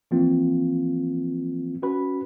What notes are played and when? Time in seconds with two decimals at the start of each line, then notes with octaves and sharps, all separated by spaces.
0.11 E3 F3 A#3 C4 F4
1.82 C#4 F#4 B4 B5